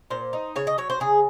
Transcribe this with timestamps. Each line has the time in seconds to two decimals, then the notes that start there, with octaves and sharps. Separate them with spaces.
0.10 A#2 C5
0.33 D#4
0.56 C#3 C#5
0.67 D#5
0.78 F#3 C#5
0.90 C5
1.00 C#3 G#4